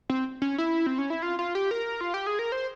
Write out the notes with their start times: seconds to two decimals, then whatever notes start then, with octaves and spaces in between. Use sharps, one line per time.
0.10 C4
0.42 C#4
0.58 E4
0.86 C4
0.98 C#4
1.10 E4
1.22 F4
1.39 F4
1.55 G4
1.71 A#4
2.01 F4
2.14 G4
2.27 G#4
2.39 A#4
2.52 C5